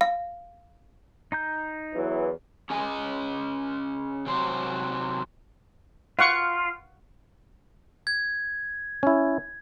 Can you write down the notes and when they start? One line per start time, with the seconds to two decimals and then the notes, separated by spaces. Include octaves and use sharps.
0.01 F5
1.32 D#4 A#5 G6
1.95 E2 E3 F#3
2.70 C#4 G#4 D#5 G#5
4.26 C3 F#3 C5
6.19 F4 F5 F#5 C#6
8.07 G#6
9.03 C#4 E4